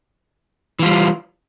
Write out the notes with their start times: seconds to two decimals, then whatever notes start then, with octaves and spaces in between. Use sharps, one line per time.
0.79 E3
0.83 F4
0.86 G3